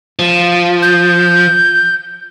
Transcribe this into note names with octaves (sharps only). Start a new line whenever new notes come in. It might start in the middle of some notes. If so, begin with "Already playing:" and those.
F3
G6